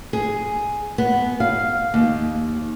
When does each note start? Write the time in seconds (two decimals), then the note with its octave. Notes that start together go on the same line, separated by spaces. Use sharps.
0.13 G#4
0.98 B3
1.40 F5
1.94 D#2